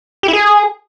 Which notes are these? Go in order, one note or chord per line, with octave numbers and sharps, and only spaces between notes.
G4
E4
G#4